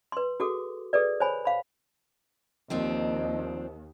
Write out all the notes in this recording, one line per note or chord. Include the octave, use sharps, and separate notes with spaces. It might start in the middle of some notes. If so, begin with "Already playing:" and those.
B4 C6
F#4 G#4 A4 D6
G#4 A4 B4 D5
C5 C#5 G#5 B5
F5 B5
D#2 F3 C4 D4 D#5